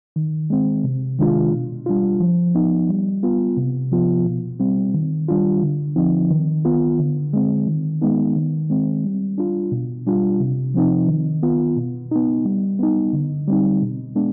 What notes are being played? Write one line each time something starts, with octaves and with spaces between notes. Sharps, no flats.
D#3
G#3 C4
C3
D#3 G#3 D4 F4
B2
G3 D4 F4
F3
B3 D#4
G3
B3 F4
C3
F3 B3 F4
B2
G3 C4
D#3
G3 D4 F4
D3
F3 C4 D#4
D#3
B3 F4
D3
G#3 C4
D#3
G#3 B3 D#4
D#3
G#3 C4
G3
D4 F4
B2
G3 D4 F4
C3
F3 C4 D#4
D#3
B3 F4
B2
B3 D#4
G3
B3 D#4
D3
G3 C4 D#4
B2
G#3 B3 D4